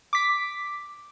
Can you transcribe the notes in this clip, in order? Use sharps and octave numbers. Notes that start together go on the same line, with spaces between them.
D6 B6